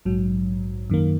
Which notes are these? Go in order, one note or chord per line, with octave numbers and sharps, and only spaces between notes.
A#1 G#2 F#3
F#2 D#3 A#3